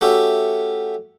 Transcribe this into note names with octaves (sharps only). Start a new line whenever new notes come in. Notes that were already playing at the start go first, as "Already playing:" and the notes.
A3 C#4 F#4 G4 E5